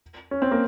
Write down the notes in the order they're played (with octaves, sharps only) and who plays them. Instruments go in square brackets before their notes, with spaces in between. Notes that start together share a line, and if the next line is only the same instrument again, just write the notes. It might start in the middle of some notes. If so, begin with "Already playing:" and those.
[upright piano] C#4
C4
A#3